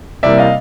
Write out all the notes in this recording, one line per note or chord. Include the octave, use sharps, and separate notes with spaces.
C3 E3 G3 A#3 D5 E5
D#5 F5